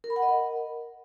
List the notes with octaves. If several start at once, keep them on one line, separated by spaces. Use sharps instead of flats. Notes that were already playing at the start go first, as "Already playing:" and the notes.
A#4
B5
F#5
D#5
A#4